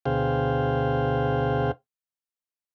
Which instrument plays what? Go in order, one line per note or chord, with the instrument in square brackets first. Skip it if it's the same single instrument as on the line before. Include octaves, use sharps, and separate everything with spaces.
[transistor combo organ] D2 B2 G#4 C5 F5 G5